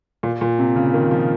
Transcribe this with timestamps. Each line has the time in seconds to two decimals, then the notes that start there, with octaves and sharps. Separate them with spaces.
0.23 A#2
0.41 A#2
0.59 C3
0.76 C#3
0.94 D#3
1.11 F3